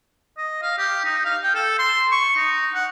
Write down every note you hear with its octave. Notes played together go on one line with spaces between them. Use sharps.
D#5
F5
G4
D#4
F5
G5
A4
C6
C#6
D#4
F#5